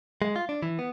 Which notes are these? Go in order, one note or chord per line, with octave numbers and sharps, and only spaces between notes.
G#3
F4
D4
E3
B3